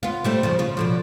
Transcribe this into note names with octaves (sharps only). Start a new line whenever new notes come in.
B3 F4
G3 A3 C4
F2 C#3 F3
C#3 F4
B2 D3 F3